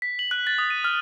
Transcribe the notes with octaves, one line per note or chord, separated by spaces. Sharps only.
B6
F#7
F#6
A6
D#6
D#7
F6